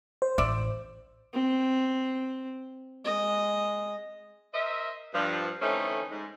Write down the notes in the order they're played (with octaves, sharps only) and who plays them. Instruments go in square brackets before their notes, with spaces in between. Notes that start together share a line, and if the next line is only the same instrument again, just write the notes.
[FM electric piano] C5
[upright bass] A1 [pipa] D5 E5
[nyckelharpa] C4
G#3 D#5
[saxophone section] A#4 C5 D#5 E5
G2 F3
D3 E3 A3 C4 C#4 D#4
G#2